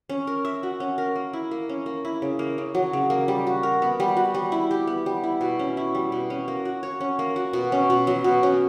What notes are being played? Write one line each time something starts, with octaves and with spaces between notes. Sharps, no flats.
C#4
A#4
E5
F#4
C#4
A#4
A#3
E4
A#3
C#4
A#3
E4
C#3
A#3
C#3
F#3
C#3
A#3
G3
F#4
A#4
B3
G3
F#4
G3
E4
G4
B3
G3
E4
B2
C#4
E4
G3
B2
C#4
A#3
F#4
C#5
C#4
A#3
F#4
B2
C#4
B2
F#3
B2
C#4